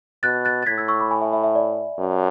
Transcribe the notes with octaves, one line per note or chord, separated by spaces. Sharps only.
B2 F#6 A6
F#6 A6
A6
A2 G#6 B6
E6 G#6
C#6 E6
B5 D6
G#5 B5
E5 G#5
E5
E5
D5
F#2